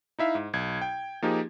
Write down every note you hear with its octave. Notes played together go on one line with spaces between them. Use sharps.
D#4 E4 E5 F5
G#2
B1 G#6
G5
F3 A#3 D#4 G4 G#4